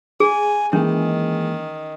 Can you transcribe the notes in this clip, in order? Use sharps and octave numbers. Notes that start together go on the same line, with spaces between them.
G#4 G#5
D#3 E3 G#3 A#3 C#4